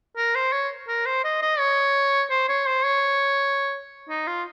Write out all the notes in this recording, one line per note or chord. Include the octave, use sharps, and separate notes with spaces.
A#4
C5
C#5
A#4
C5
D#5
D#5
C#5
C5
C#5
C5
C#5
D#4
F4